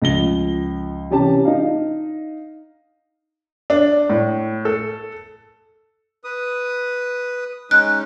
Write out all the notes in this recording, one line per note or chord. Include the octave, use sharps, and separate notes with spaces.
C#2 F3 A#6 G7
C3 E3 C#4 G4 A5
D#4 D#5 F5
D4
A2
A4
B4 D#6
G#3 C#4 D#4 F#6